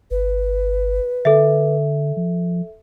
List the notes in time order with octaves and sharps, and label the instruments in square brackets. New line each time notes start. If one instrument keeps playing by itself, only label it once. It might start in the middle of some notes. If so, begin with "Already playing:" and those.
[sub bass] G1 [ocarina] B4
[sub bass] D3 [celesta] A4 E5
[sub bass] F3